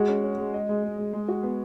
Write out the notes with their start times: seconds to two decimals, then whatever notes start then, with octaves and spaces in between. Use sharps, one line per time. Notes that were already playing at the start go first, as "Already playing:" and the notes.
Already playing: G#3 F#4
0.09 C#4
0.24 C#4
0.38 G#3
0.54 D#5
0.69 G#3
0.83 G#3
0.98 G#3
1.13 G#3
1.28 F#4
1.43 B3